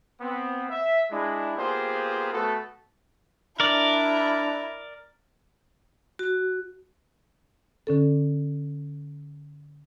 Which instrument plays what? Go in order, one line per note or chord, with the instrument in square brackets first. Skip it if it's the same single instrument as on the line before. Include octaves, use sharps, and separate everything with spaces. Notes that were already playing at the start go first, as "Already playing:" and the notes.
[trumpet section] B3 C4
E5
G#3 D4 E4
A#3 B3 F4 G4 G#4 C5
A3 B3 F#4 A4
[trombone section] D4 [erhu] E4 [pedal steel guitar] A#4 D5
[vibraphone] F#4
[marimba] D3 C#4 A4